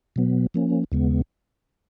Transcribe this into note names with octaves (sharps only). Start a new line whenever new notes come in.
B2 F#3 B3
F3 A#3 C#4
D#2 C#3 G#3 B3